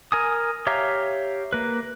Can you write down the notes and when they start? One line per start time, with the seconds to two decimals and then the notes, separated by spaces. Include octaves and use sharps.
0.12 A#4 G#5 D#6
0.67 G4 C#5 E5 F5 A#5
1.53 A#3 B4